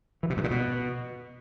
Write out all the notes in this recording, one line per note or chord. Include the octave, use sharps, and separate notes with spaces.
E3
C3
G2
A#2
B2